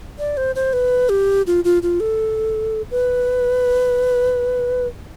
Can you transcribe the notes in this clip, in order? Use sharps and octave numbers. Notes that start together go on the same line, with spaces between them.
D5
C5
C5
B4
G4
F4
F4
F4
A4
B4